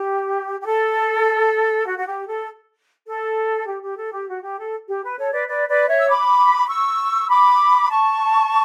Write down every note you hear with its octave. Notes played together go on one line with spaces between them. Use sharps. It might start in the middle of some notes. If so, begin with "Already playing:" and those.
Already playing: G4
G4
A4
F#4
F#4
G4
A4
A4
G4
G4
A4
G4
F#4
G4
A4
G4
B4
A4 C#5
B4 D5
B4 D5
B4 D5
C#5 E5
E6
B5 D6
C#6 E6
B5 D6
A5 C#6